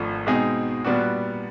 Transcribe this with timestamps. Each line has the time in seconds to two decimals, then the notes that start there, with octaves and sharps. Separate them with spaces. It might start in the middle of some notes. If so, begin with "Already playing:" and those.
Already playing: G#1 G#2 F3 A3 D4
0.27 B2 G#3 C4 D#4 G#4
0.84 A#2 G3 B3 D4 F#4